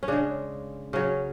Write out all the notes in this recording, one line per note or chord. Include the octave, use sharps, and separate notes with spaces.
C#4
C#3 G#3 D4
C#3 F#3 C#4